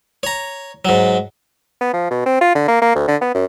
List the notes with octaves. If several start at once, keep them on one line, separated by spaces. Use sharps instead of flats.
C#5 A#5
G#2 F#3
B3
F3
B2
C4
F4
D3
A#3
A#3
D2
D3
B3
F#2